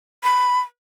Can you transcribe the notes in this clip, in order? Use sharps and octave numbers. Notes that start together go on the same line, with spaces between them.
B5